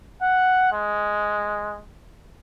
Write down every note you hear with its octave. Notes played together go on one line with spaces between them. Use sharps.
F#5
G#3